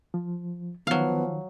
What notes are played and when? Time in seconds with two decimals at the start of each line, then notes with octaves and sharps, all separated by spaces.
0.14 F3
0.87 D#3 F3 F#3 B3 F5